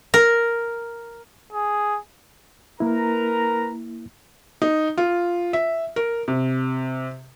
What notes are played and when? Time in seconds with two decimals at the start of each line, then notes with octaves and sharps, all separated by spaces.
0.14 A#4
1.52 G#4
2.80 A#3 E4 A#4 B4 A#5
4.62 D#4
4.98 F4
5.53 E5
5.96 A#4
6.28 C3